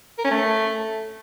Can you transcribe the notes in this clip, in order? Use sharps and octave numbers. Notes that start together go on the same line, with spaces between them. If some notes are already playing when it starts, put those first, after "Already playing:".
A#4
C#4
A3